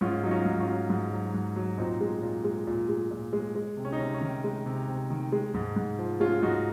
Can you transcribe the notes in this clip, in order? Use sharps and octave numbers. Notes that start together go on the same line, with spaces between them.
G#2 C#4 F4
F#3 D#4
C#4 F4
G#2
C#4 F4
F#3
G#2
F#3
G#2
F#3
A#2 C4 D#4
G#3
A#2
G#3
A#2
G#3
A#2
G#3
G#3
C3
C#4
D#4
C3 C#4
C#4
D#3
G#3
C3
C3
D#3
G#3
G#2
G#2
F3
G#3 C#4 F4
F4
G#2 D#4 F#4